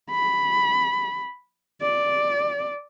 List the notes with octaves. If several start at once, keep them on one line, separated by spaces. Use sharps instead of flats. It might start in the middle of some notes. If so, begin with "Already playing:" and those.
B5
D5